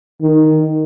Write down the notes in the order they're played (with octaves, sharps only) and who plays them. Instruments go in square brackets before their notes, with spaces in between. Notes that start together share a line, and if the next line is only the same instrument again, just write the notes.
[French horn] D#3